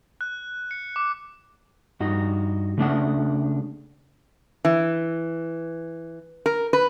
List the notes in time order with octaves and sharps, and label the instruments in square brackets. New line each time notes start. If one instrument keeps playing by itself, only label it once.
[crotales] F#6
C#7
D6
[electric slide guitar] G2 D#4 F#4
C#3 A3 D4 F#5
[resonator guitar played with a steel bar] E3
A#4
B4